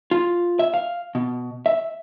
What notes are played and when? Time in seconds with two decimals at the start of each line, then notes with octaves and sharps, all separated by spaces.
0.11 F4
0.59 E5
0.74 F5
1.15 B2
1.66 E5